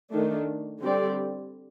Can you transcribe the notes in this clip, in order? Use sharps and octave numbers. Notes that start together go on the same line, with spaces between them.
D#3 A3 D4
D3 G3 C4 G4 D5